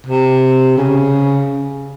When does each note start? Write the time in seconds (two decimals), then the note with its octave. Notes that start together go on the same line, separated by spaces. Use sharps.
0.06 C3
0.77 C#3